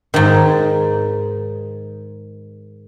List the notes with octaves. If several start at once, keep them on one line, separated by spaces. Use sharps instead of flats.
G#2 D#3